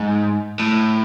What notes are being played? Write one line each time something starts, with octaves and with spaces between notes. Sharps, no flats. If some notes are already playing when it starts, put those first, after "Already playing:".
Already playing: G#2
A2